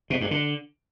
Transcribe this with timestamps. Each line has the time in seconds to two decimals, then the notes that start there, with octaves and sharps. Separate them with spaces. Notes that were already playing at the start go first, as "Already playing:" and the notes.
0.10 B2
0.21 G2
0.31 D3